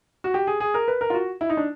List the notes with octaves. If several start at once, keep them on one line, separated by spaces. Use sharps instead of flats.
F#4
G4
G#4
G#4
A#4
B4
A#4
F4
F#4
E4
D#4
D4